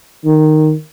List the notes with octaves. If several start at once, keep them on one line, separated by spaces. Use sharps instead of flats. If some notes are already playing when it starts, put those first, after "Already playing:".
D#3